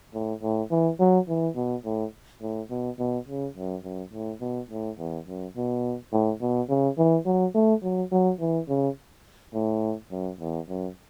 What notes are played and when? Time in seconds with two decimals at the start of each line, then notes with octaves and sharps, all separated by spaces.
0.14 A2
0.42 A2
0.71 E3
0.99 F#3
1.28 E3
1.56 B2
1.85 A2
2.41 A2
2.70 B2
2.99 B2
3.27 C#3
3.56 F#2
3.84 F#2
4.13 A2
4.41 B2
4.70 A2
4.98 E2
5.27 F#2
5.56 B2
6.12 A2
6.41 B2
6.69 C#3
6.98 E3
7.26 F#3
7.54 A3
7.83 F#3
8.12 F#3
8.40 E3
8.69 C#3
9.54 A2
10.11 F#2
10.40 E2
10.69 F#2